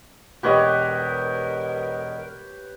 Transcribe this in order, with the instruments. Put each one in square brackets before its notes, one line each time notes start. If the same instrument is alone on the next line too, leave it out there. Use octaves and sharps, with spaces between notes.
[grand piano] E1 B3 D#5 [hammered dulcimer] G4 B4 C#5 [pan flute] A#4